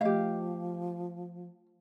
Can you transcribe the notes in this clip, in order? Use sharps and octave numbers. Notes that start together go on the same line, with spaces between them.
F3 A3 G4 D#5 F5